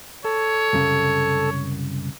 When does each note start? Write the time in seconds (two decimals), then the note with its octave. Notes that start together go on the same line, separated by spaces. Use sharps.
0.25 A4 C#5
0.73 C2 F#2 C#3